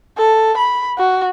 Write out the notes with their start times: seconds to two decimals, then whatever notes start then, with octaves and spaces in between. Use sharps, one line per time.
0.18 A4
0.57 B5
0.98 F#4